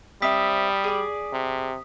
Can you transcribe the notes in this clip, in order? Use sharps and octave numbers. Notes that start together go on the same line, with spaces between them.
G3 C4 E5 D#6 B6
G#4 D5
C3